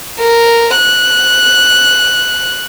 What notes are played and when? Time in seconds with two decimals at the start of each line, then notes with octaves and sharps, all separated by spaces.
0.20 A#4
0.76 F#6